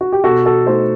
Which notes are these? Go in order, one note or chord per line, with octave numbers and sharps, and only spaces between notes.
F#4
G4
B2 F#4 A4
F#4 A4
A3 D#4 A4 C5